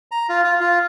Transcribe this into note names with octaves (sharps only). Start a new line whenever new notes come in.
A#5
F4
F4
F4